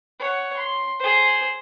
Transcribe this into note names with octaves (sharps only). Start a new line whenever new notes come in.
C#5 F#5
C6
G#4 C5